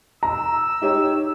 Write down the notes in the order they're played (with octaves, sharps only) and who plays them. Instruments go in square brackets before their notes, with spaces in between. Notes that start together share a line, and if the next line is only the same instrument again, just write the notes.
[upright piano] A#5 [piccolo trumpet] E6
[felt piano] D#4 G4 C#5